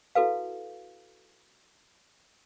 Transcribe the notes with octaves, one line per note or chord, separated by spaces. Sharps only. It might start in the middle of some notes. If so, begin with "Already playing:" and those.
E4 F#4 A4 B4 F5